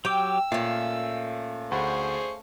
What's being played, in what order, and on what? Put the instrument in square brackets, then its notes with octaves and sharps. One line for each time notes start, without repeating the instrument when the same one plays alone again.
[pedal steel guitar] F#3 G4 D6 [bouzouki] G5 [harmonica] E6
[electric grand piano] A#2 [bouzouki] A3 C#4 [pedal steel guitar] F5
[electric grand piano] D2 F#5 B5 [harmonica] G#4 C5 C#6